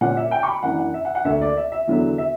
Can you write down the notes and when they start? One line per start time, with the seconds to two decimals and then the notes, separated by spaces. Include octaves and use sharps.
0.01 A#2 G3 C#4 F#5
0.17 E5
0.31 G5
0.43 C#6
0.47 B5
0.63 F#2 E3 A#3 D4 F#5
0.79 F#5
0.94 E5
1.05 F#5
1.15 F#5
1.25 D2 D3 A#3 E5
1.42 D5
1.57 E5
1.72 E5
1.87 E2 D3 F#3 B3
2.18 E5